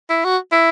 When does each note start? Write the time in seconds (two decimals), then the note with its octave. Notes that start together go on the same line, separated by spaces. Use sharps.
0.10 E4
0.24 F#4
0.52 E4